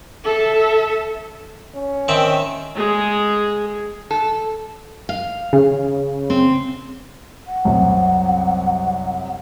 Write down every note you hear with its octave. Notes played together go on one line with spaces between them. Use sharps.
A4 E5
C#4
D#3 C4 E5
G#3 G#4
A4
F5
C#3
C4
F#5
C2 F#2 C3